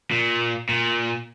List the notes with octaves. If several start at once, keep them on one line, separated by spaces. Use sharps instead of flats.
A#2
A#2